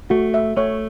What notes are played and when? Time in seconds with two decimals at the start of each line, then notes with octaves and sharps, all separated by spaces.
0.10 A3 F#4
0.34 E5
0.57 A3 C#5